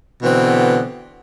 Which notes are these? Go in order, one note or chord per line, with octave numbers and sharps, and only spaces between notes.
B2 D3 E3 B3 C4